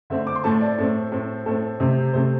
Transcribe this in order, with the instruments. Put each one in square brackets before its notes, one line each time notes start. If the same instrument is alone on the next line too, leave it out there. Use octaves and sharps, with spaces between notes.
[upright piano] D3 A3 C4 E5
D6
C6
A2 A3 C4 A5
D5
A2 A3 C4
A2 A3 C4
A2 A3 C4 A4
C3 A3 C4
C3 A3 C4 C5